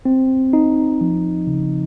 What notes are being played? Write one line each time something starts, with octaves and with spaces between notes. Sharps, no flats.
C4
D#4
F3
C#3